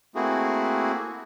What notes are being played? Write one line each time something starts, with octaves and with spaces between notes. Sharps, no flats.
A3 A#3 C4 E4 F#4 G#4